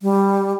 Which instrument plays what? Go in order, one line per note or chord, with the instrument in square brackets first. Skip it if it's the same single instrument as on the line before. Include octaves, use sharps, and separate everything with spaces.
[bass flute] G3